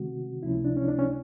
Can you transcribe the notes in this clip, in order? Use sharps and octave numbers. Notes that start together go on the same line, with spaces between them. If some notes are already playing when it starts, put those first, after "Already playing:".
Already playing: C3 D#3 G#3 C4 F#4
C#2 C3 F3 A3 C#4 E4
D4
C#4
D4
C#4